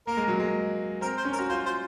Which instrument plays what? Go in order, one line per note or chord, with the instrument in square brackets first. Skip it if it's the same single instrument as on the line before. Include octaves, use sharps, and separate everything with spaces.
[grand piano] A#3 [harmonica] A#4
[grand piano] G#3
F#3
G#3
[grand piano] C4 [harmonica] A#4
[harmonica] C5
[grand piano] C#4
[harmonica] A#4
[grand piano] F#4
[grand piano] F4 [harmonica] C5
[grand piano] F4 [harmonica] C5